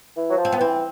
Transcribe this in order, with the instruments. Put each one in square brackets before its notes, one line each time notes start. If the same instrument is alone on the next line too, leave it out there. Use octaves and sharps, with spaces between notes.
[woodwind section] E3
F#3
F3
[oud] C4
B3
[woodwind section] E3 [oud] C4